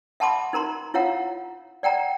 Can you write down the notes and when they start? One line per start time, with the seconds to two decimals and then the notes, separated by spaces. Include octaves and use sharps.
0.20 E5 F#5 A5 B5 C6 D6
0.53 D#4 A#4 A#5 C6
0.94 E4 F4 C#5 F5 F#5 A#5
1.83 D5 F#5 G5 A#5